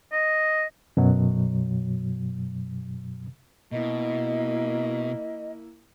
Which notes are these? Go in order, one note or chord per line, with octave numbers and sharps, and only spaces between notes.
D#5
F#2 B2 F#3
B2 A#3 E4 D#5